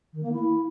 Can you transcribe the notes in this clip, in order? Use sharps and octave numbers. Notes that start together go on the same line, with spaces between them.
D#3
A#3
E4